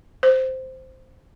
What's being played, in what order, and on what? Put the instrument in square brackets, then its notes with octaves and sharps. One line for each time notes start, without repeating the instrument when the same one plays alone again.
[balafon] C5